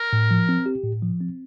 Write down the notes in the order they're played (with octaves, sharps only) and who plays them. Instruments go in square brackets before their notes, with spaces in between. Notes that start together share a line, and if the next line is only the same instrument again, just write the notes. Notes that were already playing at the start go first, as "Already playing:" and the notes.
Already playing: [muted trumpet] A#4
[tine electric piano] A2
F3
C4
G4
A2
F3
C4